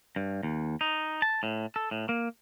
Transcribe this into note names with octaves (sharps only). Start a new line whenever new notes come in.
G2
D#2
D#4
A5
A2
A4
A2
A#3